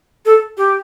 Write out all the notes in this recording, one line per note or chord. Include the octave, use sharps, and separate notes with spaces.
A4
G4